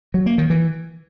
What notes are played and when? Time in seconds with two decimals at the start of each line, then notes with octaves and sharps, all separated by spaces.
0.14 F#3
0.26 A#3
0.38 D#3
0.50 E3